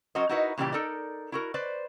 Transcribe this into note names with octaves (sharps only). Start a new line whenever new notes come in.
F#3 C#4 F#4 A#4 C5 D#5
D#4 E4 F#4 A#4 B4 D#5
A#2 C#3 E3 G3 G4 D5
D#4 A4 A#4 D5
E4 F#4 A#4
B4 C5 D5